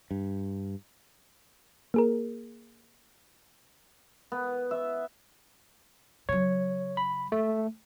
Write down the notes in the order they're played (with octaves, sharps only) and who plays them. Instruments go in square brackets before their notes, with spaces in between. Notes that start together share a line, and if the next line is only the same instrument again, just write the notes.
[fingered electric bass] G2
[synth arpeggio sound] A#3 G#4 A#4
[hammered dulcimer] B3
E5
[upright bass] C#3 F#3 [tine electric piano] C#5
[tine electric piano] B5
A3